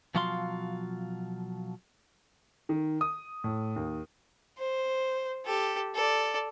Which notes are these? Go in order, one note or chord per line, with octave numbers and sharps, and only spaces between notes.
B2 F3 F#3 F4 F5 C6
D#3
D#6
A2
D#2
C5
G4 A4
A4 D5